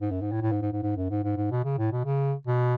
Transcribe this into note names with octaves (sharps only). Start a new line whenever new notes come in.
G#2
F#2
G#2
A2
A2
G#2
G#2
G#2
G#2
F#2
G#2
G#2
G#2
B2
C#3
A2
B2
C#3
B2